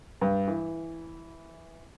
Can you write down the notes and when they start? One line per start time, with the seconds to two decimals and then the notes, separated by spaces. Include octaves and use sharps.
0.21 G2
0.48 E3